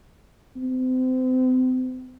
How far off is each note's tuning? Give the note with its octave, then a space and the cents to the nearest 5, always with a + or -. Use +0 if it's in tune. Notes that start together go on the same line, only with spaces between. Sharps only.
C4 -35